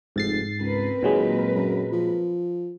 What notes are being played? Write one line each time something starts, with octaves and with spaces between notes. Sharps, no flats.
F1 G#2 A6 C7
C#2 C4 A#4 B4
D#2 A#2 F#3 G#3
F#2
F3